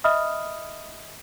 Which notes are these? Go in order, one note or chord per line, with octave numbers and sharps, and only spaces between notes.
D#5 E5 B5 D#6 F6